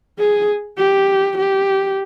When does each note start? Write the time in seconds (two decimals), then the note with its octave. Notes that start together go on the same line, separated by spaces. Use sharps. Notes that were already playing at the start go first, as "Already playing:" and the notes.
0.19 G#4
0.78 G4
1.38 G4